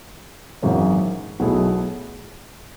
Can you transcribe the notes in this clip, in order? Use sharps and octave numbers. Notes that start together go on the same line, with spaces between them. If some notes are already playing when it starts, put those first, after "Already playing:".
G#1 F#2 E3 G#3 C#4
B1 B2 A3 E4 G#4